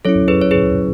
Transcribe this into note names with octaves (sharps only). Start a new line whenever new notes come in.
F#3 C#4 E4 A4 C#5
G#4 B4
C#5
G#4 B4